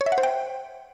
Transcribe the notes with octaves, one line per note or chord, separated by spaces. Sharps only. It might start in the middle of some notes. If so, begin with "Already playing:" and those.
C#5
E5
F#5
C5
G5